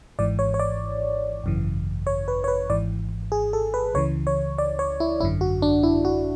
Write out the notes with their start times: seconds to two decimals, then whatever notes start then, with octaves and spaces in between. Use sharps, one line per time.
0.19 G#1 G#2 E3 D5
0.39 C#5
0.54 C#5
0.60 D5
1.43 G#1 F#2 C#3 E3
2.07 C#5
2.28 B4
2.44 C#5
2.48 B4
2.70 G#1 G#2 E3 D5
3.32 G#4
3.53 A4
3.74 B4
3.94 C#2 C#3 E3 C#5
4.27 C#5
4.58 D5
4.79 C#5
5.00 E4
5.21 G#1 F#2 D3 E4
5.41 F#4
5.62 D4
5.83 E4
6.05 F#4